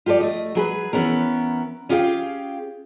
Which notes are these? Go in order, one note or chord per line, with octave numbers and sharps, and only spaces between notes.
F4 G4 A4 B4 D5
A3 D#5
F#3 G#4 B4
E3 B3 C#4 A#4
C#4 F4 G4 G#4 F5 G5